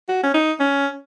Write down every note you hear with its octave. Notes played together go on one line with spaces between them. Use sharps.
F#4
C#4
D#4
C#4